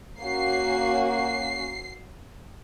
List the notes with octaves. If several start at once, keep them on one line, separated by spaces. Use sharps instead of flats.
A#3 C#4 F#4 C7
C7